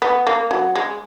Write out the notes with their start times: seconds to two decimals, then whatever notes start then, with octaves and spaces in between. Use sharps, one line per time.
0.02 B3
0.27 A#3
0.51 F#3
0.75 G#3